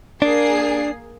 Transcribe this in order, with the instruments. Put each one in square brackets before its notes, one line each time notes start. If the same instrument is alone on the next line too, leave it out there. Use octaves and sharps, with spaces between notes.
[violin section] A#3 G#4 C7 [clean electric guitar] D4